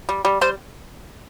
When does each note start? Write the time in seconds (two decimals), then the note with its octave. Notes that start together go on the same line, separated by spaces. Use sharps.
0.09 G3
0.25 G3
0.41 G3 C5